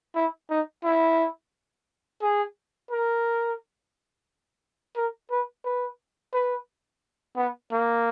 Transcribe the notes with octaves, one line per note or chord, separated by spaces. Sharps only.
E4
D#4
E4
G#4
A#4
A#4
B4
B4
B4
B3
A#3